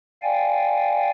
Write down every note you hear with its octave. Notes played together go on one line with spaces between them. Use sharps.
D5 F5 G5 G#5